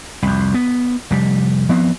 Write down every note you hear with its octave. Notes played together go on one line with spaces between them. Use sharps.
C2 F2
B3
F1 G3
F3 B3 C4